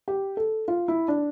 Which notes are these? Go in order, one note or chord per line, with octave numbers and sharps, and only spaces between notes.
G4
A4
F4
E4
D4